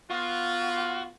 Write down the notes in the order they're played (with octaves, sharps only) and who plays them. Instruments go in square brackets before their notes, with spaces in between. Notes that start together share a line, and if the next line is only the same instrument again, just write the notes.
[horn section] B3 F4 [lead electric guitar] F#4